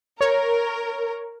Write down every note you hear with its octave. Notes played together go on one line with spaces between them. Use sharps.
A#4 C#5